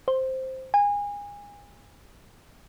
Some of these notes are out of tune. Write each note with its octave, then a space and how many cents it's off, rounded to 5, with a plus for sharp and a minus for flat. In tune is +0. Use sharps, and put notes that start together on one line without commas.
C5 +0
G#5 -30